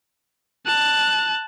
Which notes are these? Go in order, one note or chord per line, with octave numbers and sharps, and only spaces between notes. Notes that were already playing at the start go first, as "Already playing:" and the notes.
A5 F#6